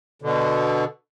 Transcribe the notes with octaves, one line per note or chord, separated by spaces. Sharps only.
B2 D3